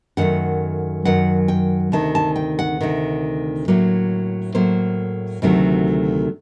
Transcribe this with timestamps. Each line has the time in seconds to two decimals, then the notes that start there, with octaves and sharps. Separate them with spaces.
0.17 F#2 D#3 F#3 A3 F#5
1.05 F#2 D#3 F#3 F#5
1.48 G5
1.92 D2 C3 D#3 A5
2.15 A5
2.36 G5
2.59 F#5
2.81 D2 C3 D#3
3.68 A2 F#3 A#3
4.55 A2 F#3 A#3 C5
5.42 D2 C3 D#3 F#3 A3